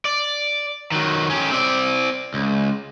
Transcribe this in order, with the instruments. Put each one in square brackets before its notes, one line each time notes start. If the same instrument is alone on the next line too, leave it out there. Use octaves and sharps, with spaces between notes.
[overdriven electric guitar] D5
D#3 F#3
C#4 G4
C4 D5
C#2